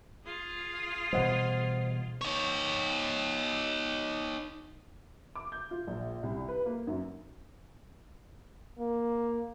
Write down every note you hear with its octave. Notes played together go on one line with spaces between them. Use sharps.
F4 G#4
B2 E3 G3 C5 D#5 F#5
D#4 C#5
D6
G6
F4
A#1
C2
B4
A#3
F#2
A#3